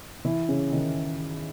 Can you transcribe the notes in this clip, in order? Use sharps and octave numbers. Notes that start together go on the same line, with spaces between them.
E3 E4
C#3 C#4
D#3 D#4